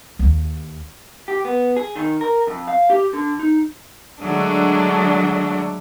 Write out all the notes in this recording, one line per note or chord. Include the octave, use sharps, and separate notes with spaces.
D#2
G4
B3
G#4
D#3
A#4
F2
F5
G4
D3
D#4
D3 F#3 G#3 A3 D4